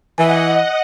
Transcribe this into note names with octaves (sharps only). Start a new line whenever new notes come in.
E3 D#5 F#5 G#5